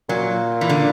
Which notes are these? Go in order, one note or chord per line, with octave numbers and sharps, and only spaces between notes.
A#2 F#3
E3
D3